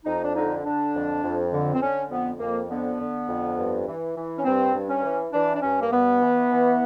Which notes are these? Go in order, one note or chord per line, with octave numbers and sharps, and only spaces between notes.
F2 D#4
D4
D3 D#4
D3 D4
F2
F2
D3
C4
D3 C#4
F2 B3
F2 A#3
D3 B3
D3
F2
G2
E3
E3
C#4
G2 C4
G2
C#4
E3
E3 D4
D4
G2 C#4
A#3
G2 B3
E3
E3